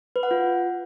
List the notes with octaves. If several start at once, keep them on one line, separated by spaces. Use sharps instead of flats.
B4
F#5
F4